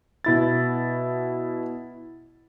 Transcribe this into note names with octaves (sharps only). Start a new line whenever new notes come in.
B2 E4 A6